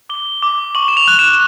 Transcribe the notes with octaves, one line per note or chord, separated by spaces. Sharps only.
D6 G7
D6
C#6 F#7
E7
F7
F#6
E7